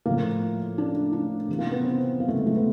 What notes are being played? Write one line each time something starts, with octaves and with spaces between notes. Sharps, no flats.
A2 F3 A#3
D4
D4
C3 E3
A#3
B3
C4
A#3
A3
G#3
A3
B3